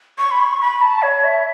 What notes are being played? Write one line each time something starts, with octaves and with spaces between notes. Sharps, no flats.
C#6
B5
C#6
B5
A5
C#5
E5